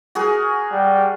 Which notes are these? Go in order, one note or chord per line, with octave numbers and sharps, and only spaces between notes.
F#4 G#4 A#4
G3